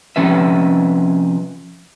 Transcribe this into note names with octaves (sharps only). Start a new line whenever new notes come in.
C3 F3 C#4 B4 E5